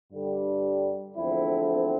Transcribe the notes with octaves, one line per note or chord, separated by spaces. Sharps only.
G2 D3 G3
E2 D3 F3 A3 C4 E4
C4